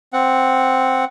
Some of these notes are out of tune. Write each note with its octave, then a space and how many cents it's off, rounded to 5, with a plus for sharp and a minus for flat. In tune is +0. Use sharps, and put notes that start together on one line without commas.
C4 +0 F#5 +0